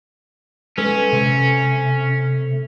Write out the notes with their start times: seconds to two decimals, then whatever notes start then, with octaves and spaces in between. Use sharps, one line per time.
0.78 G#3 C#4 A4 B4
1.13 C3 A3